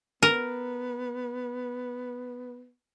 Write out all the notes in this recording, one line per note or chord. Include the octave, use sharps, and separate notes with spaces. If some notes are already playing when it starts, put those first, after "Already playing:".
B3 A#4